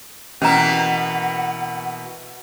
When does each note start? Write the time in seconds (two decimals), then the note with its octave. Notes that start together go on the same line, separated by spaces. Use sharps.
0.42 B2 E3 A#3 C#4 F#5 A#5